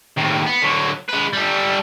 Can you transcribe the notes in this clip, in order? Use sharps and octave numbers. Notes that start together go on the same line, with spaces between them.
D#2 A2
B3
D3 F#3
G#3 B4
G3 A4